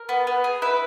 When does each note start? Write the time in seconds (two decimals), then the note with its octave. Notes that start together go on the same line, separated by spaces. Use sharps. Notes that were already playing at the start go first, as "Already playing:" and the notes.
Already playing: A#4
0.09 B3
0.27 B3
0.44 G#4
0.62 E4 B4